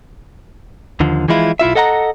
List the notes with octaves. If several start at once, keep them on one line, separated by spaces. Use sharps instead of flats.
D#2 D3 F3
E3 F3 G#3 E4 F4
B1 E4 F4 E5
A4 D#5 F#5 G#5 A#5